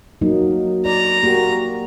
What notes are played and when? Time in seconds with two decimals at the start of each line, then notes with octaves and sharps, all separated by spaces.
0.21 F#3 A#3 D#4
0.85 D5 A#5
1.23 A#3 F#4 G4